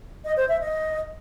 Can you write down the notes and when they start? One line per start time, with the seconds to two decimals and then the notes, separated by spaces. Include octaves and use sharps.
0.25 D#5
0.37 C5
0.49 E5
0.61 D#5